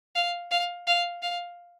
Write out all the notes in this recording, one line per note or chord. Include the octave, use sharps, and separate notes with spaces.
F5
F5
F5
F5